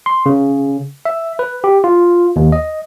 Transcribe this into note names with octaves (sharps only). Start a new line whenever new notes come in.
C6
C#3
E5
B4
G4
F4
D#2
D#5